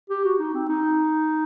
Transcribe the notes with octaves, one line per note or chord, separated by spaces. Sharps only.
G4
F#4
D#4
C4
D#4